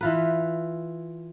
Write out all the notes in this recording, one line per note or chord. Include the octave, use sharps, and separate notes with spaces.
E3 F4 B4